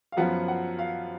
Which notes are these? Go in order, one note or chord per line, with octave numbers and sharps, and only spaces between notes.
F5
F#2 F3 B3 F4 F#5
F#5
F5